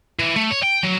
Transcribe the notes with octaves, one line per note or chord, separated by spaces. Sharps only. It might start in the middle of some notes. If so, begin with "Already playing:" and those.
E3
A3
C#5
G5
F#3